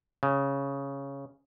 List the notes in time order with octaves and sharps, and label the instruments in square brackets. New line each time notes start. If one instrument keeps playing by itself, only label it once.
[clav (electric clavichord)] C#3